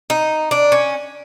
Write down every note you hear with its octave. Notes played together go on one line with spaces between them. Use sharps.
D#4
D4
C#4